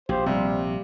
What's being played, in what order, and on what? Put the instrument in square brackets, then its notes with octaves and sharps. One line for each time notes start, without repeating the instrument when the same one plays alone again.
[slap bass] A#1 [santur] G4 F5 [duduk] C5
[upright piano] C3 [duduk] G3